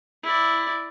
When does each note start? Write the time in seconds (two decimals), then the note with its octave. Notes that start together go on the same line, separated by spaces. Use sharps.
0.22 E4 D5